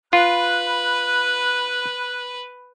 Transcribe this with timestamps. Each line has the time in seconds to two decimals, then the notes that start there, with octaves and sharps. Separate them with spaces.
0.13 F4 B4 B5 F#6